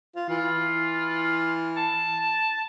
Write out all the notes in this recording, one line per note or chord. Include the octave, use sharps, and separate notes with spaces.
F4
E3 F4
A5